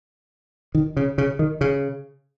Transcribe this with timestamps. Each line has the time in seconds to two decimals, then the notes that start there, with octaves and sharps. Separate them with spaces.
0.75 D#3
0.97 C#3
1.18 C#3
1.39 D#3
1.61 C#3